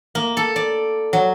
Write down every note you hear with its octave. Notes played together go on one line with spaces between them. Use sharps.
A#3
A4
D5
F#3